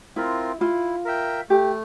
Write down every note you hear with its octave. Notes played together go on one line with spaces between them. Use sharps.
C4 E4 F4 A#4
E4 F4
A#4 E5 G5
A3 G4